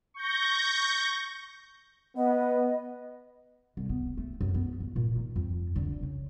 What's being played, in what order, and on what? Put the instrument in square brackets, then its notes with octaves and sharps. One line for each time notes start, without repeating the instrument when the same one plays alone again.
[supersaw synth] C#6 G6 A#6
[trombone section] B3 [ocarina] D#5
[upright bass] C2
B3
A3
F#2
B3
A1
A#2
D#3
F2
D3
C#3